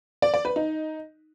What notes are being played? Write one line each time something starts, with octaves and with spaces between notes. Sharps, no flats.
D5
D5
B4
D#4